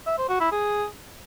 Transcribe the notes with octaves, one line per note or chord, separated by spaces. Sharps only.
E5
C5
F#4
E4
G#4